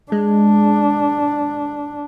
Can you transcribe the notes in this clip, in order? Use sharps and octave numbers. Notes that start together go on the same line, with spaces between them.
G#3 D4